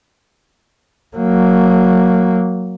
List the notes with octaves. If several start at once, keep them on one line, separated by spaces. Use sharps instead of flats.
F#3 A#3